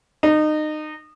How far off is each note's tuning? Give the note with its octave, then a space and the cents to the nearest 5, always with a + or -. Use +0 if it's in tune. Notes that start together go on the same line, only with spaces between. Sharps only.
D#4 -25